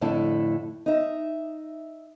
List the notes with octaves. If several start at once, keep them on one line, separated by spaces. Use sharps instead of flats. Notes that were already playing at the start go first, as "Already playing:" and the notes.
F2 A2 D3 E4 A4
D#4 E5